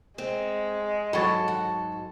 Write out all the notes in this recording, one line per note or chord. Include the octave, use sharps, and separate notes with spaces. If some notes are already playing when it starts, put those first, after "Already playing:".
G#3 C4
G#2 F#3 F#4 A4 C#5 B5 C#6 A6
F#4